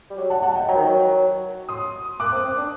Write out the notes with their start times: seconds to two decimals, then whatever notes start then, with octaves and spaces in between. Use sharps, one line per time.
0.10 G3
0.18 F#3
0.30 F#5 A5
0.42 F#5 A5
0.55 D#5 G5
0.68 F#3 G5 A#5
0.76 D#3
0.84 F#3
1.69 C6 D#6
2.20 A#3 D6 F#6
2.32 C4
2.45 C4
2.57 D4